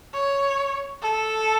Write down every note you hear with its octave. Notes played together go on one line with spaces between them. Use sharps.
C#5
A4